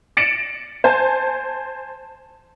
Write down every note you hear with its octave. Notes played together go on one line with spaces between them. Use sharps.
A6 A#6 C#7 D7 E7 F#7
C5 G#5 A5